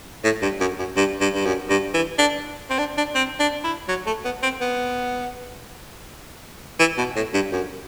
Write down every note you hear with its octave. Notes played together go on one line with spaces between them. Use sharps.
A2
G2
F#2
F#2
G2
G2
G2
F#2
G2
E3
D4
C4
D4
D4
C4
D4
E4
F#3
A3
B3
C4
B3
E3
B2
A2
G2
F#2